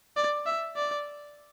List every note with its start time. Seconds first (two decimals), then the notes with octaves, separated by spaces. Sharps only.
0.17 D5
0.46 E5
0.76 D5